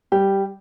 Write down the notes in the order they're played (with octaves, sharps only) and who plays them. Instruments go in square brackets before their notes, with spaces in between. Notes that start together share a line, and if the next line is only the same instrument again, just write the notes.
[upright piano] G3 [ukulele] G4